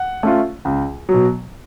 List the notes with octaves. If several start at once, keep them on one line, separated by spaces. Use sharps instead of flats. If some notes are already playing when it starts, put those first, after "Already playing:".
Already playing: F#5
A3 C#4 F4
C#2
B2 F#3